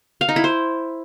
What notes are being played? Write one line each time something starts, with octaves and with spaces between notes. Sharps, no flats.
F5
D#4
E4
C5